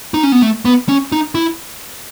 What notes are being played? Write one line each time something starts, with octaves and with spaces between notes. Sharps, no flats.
D#4
C#4
B3
A3
B3
C#4
D#4
E4